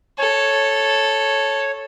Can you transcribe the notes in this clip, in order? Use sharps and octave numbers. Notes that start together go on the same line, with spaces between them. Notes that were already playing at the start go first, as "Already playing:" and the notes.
A4 C#5